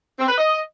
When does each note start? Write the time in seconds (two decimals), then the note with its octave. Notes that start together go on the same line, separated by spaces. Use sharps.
0.19 C4
0.28 B4
0.38 D#5